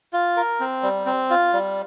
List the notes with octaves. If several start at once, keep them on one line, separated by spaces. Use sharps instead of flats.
F4
A#4
C4
G3
C4
F4
G3